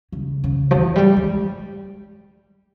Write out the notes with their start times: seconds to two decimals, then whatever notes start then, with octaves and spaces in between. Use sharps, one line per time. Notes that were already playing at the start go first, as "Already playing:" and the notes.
0.12 C#3
0.44 C#3
0.71 F3
0.75 E3
0.96 G3
1.17 G#3